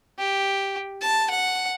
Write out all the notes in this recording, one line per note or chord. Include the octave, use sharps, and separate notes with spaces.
G4
A5
F#5